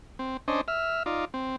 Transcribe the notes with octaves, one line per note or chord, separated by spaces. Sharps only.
C4
C#4 D4 C5 D#5
E5 F6
D#4 F4 D5
C4